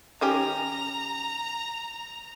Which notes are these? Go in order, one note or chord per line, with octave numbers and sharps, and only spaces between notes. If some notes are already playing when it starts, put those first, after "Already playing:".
D#3 C#4 G4 A#5